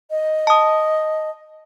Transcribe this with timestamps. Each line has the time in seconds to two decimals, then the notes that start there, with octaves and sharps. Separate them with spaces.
0.11 D#5
0.47 A5 D#6